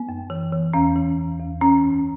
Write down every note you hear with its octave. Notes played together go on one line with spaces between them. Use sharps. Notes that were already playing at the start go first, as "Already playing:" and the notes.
Already playing: B3
F#2
E3
E3
E2 C#4
E3
E2
E2
E3 C#4
F#2